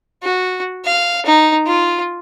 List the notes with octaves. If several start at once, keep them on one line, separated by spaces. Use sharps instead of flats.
F#4
F5
D#4
F4